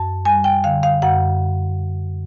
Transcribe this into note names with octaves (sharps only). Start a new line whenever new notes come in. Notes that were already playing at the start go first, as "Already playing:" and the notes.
Already playing: F#2 A5
G3 G#5
G5
D3 F5
F5
F#2 F#5